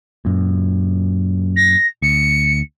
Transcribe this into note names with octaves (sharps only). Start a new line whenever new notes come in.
F#2 A#2
A#6
D2 C#7